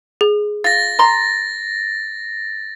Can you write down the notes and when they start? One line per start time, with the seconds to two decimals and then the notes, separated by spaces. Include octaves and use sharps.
0.21 G#4
0.64 F4 A6 A#6
0.99 A#5 C6